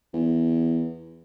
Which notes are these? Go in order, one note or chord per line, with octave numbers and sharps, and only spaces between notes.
E2